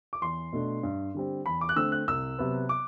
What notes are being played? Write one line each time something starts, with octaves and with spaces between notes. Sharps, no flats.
D6
E2 C6
B2 A3 D4
G2
D3 G3 C4
E2 B5
D6
F#6
D3 A3 C4 E6
F#6
C2 E6
C3 F#3 B3
D6